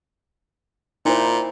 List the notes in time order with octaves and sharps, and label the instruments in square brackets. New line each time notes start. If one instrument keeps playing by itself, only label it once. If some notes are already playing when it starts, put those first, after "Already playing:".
[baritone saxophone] A#2 [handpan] D#4 E4 C5